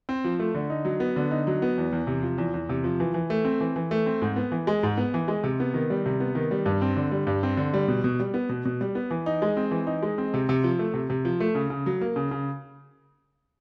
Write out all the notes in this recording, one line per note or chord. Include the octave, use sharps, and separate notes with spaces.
C4
F3
A3
D3
D#4
F#3
B3
D3
D#4
F#3
B3
E2
E2
C3
F3
E2
E2
C3
F3
E3
E3
A3
C4
E3
E3
A3
C4
G#2
B3
E3
G#3
G#2
B3
E3
G#3
C3
B3
D#3
G3
C3
B3
D#3
G3
G2
C4
D3
G3
G2
C4
D3
G3
B2
B2
G3
B3
B2
B2
G3
B3
E3
D#4
G#3
C4
E3
D#4
G#3
C4
C3
C3
F3
A3
C3
C3
F3
A3
C#3
C#3
F#3
A#3
C#3
C#3